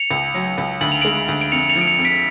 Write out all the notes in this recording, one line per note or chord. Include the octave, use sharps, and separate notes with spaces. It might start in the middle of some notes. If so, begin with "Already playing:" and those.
Already playing: C#7 F7
C#2
F#3
C#2
D2 F#7
F7
G#3 D7 F#7
D2
D7
F2 C#7 F7
C#7 F7
F3
D7
C#7 F7
F2
B6 D7